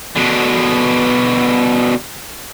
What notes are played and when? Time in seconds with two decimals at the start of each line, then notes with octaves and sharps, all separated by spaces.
0.16 B2 D3